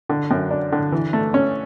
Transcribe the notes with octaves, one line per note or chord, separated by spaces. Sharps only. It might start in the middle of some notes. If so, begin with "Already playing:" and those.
D3
F#2
D4
D3
E3
A3
C#4